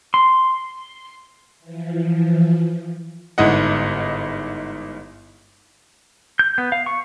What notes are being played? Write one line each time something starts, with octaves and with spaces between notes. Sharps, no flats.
C6
E3 F3
G1 G#2 E4 D#5 F#5
G6
B3
F5
C#6